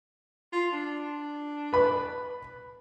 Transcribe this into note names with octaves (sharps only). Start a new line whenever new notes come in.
F4
D4
B4 B5